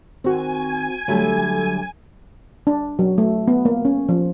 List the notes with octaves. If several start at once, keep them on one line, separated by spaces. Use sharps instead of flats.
D#3 C4 F#4 G#5
D3 F#3 G3 A3 A4
D4
F#3
A3
B3
A#3
C#4
F3